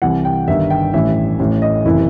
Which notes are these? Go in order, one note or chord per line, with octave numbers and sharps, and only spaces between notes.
C2 C3 E3 F#5
G5
G1 G2 D#3 E5
G5
A1 A2 E3 E5
A1 A2 E3
D#5
F#1 C3 E3 E4